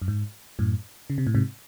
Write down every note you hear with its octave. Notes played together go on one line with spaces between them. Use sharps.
F#2
G#2
F#2 A2
C#3
C3
A2
G#2 C3